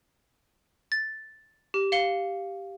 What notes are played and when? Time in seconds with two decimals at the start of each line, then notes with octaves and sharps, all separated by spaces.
0.92 A6
1.74 G4
1.92 F5 C#7 G7